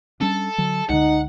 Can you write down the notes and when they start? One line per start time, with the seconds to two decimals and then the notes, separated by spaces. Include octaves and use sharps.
0.21 G3 C#4 D4 A4
0.58 D3 F#3
0.90 C#2 D3 D#4 F#5